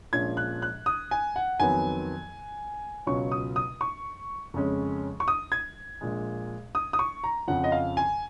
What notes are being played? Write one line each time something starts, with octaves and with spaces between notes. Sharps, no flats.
A#1 A#2 F3 G#3 C#4 G#6
F#6
F#6
D#6
G#5
F#5
F2 D#3 F#3 B3 G#5
C#2 B2 F#3 C#4 F4 C#6
D#6
D#6
C#6
F2 C#3 G#3 C#4
C#6
D#6
G#6
A#1 A#2 G#3
D#6
D#6
C#6
A#5
F2 C#3 F3 F#5
D#5
F5
G#5